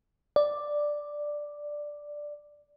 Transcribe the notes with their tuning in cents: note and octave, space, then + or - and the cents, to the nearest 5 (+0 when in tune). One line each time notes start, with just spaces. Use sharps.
D5 +5